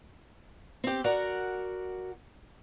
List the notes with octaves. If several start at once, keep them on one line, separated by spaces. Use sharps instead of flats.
C4 G4
F#4 A#4 D5 F#5